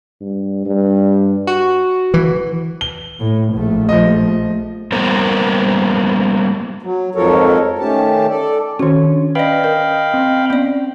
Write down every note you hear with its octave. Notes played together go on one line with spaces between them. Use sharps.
G2
G2
F#4
E3
G7
A2
A#1 A3
F3 D#5
G3 A#3 B3 A#4 C5
F#3
F2 G#2 F3 A4 A#4 C#5
D#3 A3 C#4 G4 A5
A4 D5
D#3 C#4 F#4 A4 C#5
D4
B4 D5 D#5 F5 G5 B5
A#4
C4
B3 C#4 D5